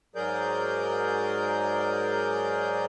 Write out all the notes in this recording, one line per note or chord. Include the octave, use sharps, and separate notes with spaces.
G#2 F#3 G#4 A#4 D5 G6